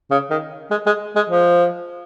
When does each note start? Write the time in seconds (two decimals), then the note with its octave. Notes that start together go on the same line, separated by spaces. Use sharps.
0.11 C#3
0.30 D#3
0.71 G#3
0.86 G#3
1.16 G#3
1.30 F3